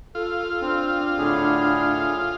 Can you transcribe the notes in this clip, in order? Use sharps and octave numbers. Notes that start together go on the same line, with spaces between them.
F4 A4
C4 D4
A2 D3 G#4